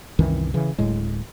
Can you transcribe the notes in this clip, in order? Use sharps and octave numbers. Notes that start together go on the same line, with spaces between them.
C2 F#2 D#3 E3
C#3 E3
D1 A2 G#3